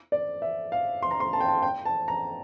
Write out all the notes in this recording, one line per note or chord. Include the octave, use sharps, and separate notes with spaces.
D5
E5
F5
C6
A#5
C6
A5
G5
A5
G5
A5
A#5